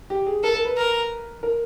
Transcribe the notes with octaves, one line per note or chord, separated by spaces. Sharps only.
G4
G#4
A4 A#4
A#4
B4
A#4
A#4